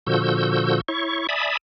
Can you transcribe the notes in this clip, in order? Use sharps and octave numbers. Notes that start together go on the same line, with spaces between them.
A#2 D3 F3 F#4 E6 G6
E4 C#5 C#6
D5 E5 G#5 A5 B5 D#6